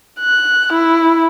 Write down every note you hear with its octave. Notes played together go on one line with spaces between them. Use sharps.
F#6
E4